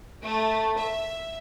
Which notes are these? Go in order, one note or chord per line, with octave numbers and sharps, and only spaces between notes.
A3
E5